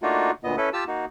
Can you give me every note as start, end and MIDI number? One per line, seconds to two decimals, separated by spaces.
0.03 0.31 57
0.03 0.31 58
0.03 0.31 62
0.03 0.31 63
0.03 0.31 65
0.03 0.31 66
0.44 0.56 38
0.44 0.56 46
0.44 0.56 59
0.44 0.56 75
0.57 0.69 61
0.57 0.69 64
0.57 0.69 69
0.57 0.69 71
0.73 0.84 65
0.73 0.84 67
0.73 0.84 81
0.73 0.84 88
0.87 1.05 58
0.87 1.05 63
0.87 1.05 66